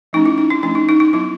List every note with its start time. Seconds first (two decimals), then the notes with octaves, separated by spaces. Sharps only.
0.13 F3 A3 C#4 D#4
0.26 E4
0.38 D#4
0.50 D4
0.63 F3 A3 C#4 D4
0.75 D#4
0.89 D#4
1.00 D#4
1.13 F#3 B3 D4 E4